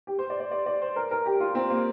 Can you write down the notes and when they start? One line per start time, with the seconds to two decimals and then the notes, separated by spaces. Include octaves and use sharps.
0.07 G4
0.19 C5
0.30 D5
0.40 D5
0.51 D5
0.66 D5
0.82 C5
0.96 A#4
1.11 A#4
1.26 G4
1.40 F4
1.55 C4
1.70 A#3